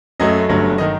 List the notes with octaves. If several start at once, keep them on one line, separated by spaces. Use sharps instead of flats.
F#2 F#3 A3 D#5
G1 G2 F#3 A3
D#3 D#5